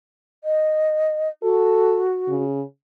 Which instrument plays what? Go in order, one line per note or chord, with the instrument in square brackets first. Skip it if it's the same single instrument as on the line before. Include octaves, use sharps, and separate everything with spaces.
[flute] D#5
[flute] F#4 [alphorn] A4
[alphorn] C#3